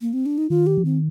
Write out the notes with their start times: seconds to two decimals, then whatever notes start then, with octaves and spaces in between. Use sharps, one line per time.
0.01 A#3
0.13 C4
0.26 D4
0.38 D#4
0.50 D#3 F4
0.67 G4
0.78 F3
0.84 D#3 C4